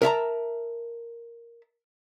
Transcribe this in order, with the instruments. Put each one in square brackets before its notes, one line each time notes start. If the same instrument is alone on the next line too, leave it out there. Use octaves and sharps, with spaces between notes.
[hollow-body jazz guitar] A#4 E5 A5 A#5